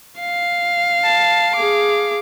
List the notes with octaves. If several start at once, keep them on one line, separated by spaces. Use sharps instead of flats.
F5
A5
G#4 D6